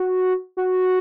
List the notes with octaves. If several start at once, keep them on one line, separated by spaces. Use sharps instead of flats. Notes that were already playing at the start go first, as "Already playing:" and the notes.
Already playing: F#4
F#4